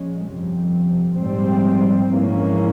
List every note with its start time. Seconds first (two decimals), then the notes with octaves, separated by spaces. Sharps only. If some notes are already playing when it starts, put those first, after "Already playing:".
Already playing: A#1 A#2 G#3 C#4
0.26 G1 F2 C3
1.18 A#1 G#2 G3 C4
2.12 A#1 G#2 E3 A#3 C#4